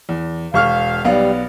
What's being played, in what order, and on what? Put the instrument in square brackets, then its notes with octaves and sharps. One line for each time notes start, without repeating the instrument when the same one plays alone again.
[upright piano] E2
[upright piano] E1 C#6 F6 [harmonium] F5
[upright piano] B1 B3 F5 [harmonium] G3